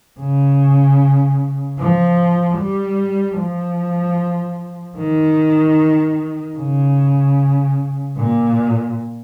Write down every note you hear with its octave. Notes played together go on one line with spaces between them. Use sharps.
C#3
F3
G3
F3
D#3
C#3
A#2